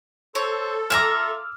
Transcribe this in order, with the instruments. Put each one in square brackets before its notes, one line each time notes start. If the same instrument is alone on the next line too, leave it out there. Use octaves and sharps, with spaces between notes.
[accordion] A4 [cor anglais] C5 [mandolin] C#5
[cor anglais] F4 [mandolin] E5 G#5 A#5 [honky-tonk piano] D6 E6 F6